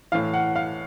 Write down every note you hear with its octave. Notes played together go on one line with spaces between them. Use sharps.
A2 E3 F5
F#5
F5